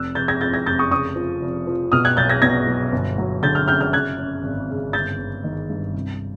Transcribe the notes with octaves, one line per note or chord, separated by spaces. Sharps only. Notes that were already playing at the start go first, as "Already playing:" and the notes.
Already playing: F1 E6 F#6
F1 G6 A6
G#6 A#6
F2 G6 A6
G#6 A#6
F1 G6 A6
C#6 D#6
C#3 C#6 D#6
F3
F1
F3
B2 D#6 F6
F#6 G#6
B1 G6 A6
G#6 A#6
B2 G#6 A#6
F#3
G1
F#3
D3 G6 A6
F6 G6
F#2 F6 G6
F6 G6
C#3 F#6 G#6
F#2
G#1
C#3
G1 G6 A6
G1
D#3
G2
C2